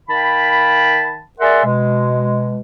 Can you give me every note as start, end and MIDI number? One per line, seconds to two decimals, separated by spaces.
0.09 1.21 51
0.09 1.21 77
0.09 1.21 79
0.09 1.21 81
0.09 1.21 83
1.39 1.63 68
1.39 1.63 70
1.39 1.63 74
1.39 1.63 76
1.39 1.63 78
1.39 1.63 84
1.65 2.60 47
1.65 2.60 56